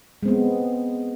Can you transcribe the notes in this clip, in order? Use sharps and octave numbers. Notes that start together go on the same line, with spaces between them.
G#3 B3 C4